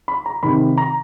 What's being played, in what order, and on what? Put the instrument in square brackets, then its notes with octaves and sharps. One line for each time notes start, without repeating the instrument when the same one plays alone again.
[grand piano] B5
A#5
C3 D#3 B5
A#5